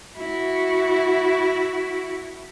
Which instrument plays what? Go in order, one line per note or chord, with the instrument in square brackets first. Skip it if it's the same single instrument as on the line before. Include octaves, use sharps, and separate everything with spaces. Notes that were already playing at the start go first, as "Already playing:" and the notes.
[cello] E4 F#4